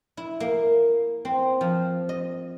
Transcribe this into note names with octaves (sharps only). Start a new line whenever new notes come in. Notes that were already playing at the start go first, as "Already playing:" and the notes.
E4
A#3
C4
F3
D#5